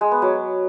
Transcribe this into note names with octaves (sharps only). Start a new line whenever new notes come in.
G#3
B3
F#3